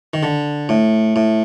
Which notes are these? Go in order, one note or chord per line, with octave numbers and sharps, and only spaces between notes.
D#3
D3
A2
A2